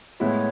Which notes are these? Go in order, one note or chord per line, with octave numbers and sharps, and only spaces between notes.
A2 G#3 B3 E4 C#5